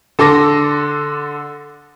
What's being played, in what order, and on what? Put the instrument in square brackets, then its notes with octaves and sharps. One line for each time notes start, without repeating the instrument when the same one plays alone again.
[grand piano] D3 A4 C6 D6 A#6